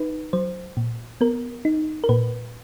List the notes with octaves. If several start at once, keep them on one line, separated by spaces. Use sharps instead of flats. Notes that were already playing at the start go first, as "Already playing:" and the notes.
Already playing: D#4 B4
F#3 C5
A#2
B3 A#4
D#4
A#4
A#2 B4